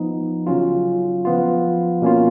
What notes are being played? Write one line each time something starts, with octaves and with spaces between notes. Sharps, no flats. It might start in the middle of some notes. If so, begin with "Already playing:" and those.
Already playing: F3 B3 D#4
C#3 F#3 C#4 F4
F3 B3 F4
B2 A#3 C#4 F4